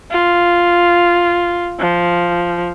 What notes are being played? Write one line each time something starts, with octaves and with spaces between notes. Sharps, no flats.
F4
F3